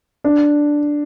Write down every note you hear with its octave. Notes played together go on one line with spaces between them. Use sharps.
D4